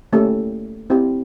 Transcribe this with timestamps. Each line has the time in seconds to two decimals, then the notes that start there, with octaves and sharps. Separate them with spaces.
0.12 A3 A#3 C#4 E4 G4 A4
0.90 C4 E4 G4